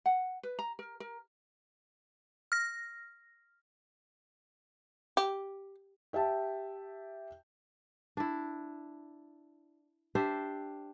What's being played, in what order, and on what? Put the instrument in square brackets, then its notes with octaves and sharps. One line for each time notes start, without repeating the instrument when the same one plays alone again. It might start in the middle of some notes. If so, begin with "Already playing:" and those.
[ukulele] F#5
B4
A#5
A#4
A#4
[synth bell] F6 A#6
[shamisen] G4
[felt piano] G4 E5 G5 A5
[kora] D4 E4
D4 G4 C5 E5